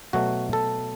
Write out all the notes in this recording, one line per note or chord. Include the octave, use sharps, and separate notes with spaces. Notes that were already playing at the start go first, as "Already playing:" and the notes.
B2 F#3 A3 F#4
A4